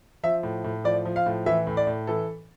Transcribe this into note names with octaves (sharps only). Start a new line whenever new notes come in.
F3 E5
A2
A2
F3 D5
F3
F5
A2
E3 E5
A2
D5
A2
E3 A4